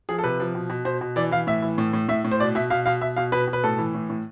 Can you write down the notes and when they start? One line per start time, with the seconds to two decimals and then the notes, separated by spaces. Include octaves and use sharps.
0.09 F3 G#4
0.19 A4
0.24 C3 B4
0.40 F3
0.55 B2
0.70 B2
0.85 B2 C5
1.01 B2
1.16 E3 D5
1.31 E3 F5
1.47 A2 E5
1.62 E3
1.78 A2
1.93 A2
2.08 A2 E5
2.24 A2
2.32 C5
2.40 B2 D5
2.55 B2 E5
2.70 B2 F5
2.86 B2 F5
3.01 B2 E5
3.17 B2 F5
3.32 B2 B4
3.48 B2
3.53 B4
3.64 A2 A4
3.78 E3
3.94 A2
4.10 A2